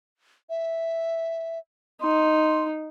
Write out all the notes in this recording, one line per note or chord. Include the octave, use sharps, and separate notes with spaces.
E5
D#4 C6